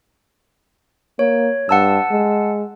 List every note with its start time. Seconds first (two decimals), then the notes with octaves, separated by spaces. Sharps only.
1.19 A#3 C#5
1.69 G2 F#5 A5 E6
2.11 G#3